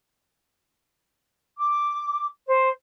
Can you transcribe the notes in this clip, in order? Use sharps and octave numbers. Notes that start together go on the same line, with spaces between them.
D6
C5